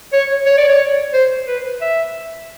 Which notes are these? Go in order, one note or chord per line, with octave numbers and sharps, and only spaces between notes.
C#5
C#5
D5
C#5
C5
B4
E5